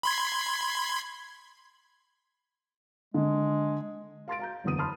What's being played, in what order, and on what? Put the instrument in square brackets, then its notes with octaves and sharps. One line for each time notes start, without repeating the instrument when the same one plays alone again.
[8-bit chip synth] B5 C6 G#6
[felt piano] D3 [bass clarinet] G#3
[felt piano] F5 C6 A6 D7
F5 A#5 G6
F#1 E2 D3 B3 D#6 D#7
A5 B5 C6 D#6 F6